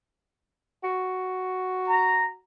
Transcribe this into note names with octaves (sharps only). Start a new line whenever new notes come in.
F#4
A#5